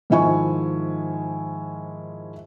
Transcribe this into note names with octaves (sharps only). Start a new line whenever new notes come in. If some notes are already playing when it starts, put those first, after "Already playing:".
G#2 D#3 F3 E4 G#5 C#6